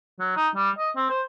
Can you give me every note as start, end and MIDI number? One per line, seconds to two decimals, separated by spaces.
0.19 0.35 54
0.36 0.48 63
0.55 0.70 55
0.79 0.90 75
0.96 1.05 60
1.10 1.21 72